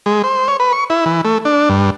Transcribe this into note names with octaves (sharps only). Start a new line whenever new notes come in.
G#3
C5
C#5
B4
C#6
E4
E3
A3
D4
G2